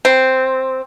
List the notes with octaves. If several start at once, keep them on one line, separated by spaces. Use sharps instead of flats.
C4